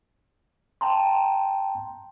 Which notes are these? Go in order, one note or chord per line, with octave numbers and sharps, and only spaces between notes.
G5 A5 A#5 C6